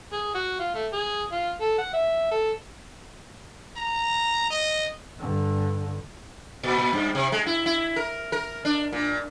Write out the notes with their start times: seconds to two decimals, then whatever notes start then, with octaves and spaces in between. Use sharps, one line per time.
0.12 G#4
0.35 F#4
0.60 F4
0.74 A3
0.93 G#4
1.32 F4
1.61 A4
1.78 F#5
1.93 E5
2.31 A4
3.77 A#5
4.50 D#5
5.19 G2 D3
6.63 A#2
6.78 A#2
6.93 G2
7.15 C3
7.32 G#3
7.46 E4
7.66 E4
7.96 A#4
8.32 A#4
8.65 D4
8.93 A#2